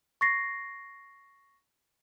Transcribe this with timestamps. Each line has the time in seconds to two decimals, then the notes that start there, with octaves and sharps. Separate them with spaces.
0.21 C#6 A6 A#6 C7